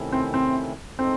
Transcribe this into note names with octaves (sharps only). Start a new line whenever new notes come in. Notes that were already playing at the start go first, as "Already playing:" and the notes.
Already playing: C3 D#3 A3 C#4 E4
C4
C4
A2 G#3 C4 D#4 A4 C5